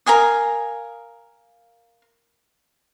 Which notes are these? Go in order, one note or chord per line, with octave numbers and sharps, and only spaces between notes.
A#4 F5 G#5 D#6